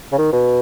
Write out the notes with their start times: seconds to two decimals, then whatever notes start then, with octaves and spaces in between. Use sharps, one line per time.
0.12 C#3
0.18 D#3
0.32 B2